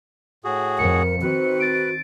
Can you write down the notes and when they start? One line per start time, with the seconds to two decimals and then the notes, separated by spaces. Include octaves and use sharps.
0.45 A2 F#4 G#4
0.79 F2 A#4 C#7
1.22 D#3 C4 F#4 B4
1.60 A6 D7